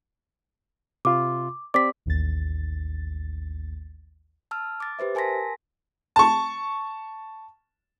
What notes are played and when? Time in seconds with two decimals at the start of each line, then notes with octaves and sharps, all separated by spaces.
1.05 C3 F4 C6 D6
1.74 C4 G4 D5 D6 B6
2.06 A1 D#2 A6
4.51 A5 E6 F6
4.80 D6 A6
4.99 G4 B4 C5 E5
5.15 A#4 G#5 A5 C6 A#6 B6
6.16 A5 C#6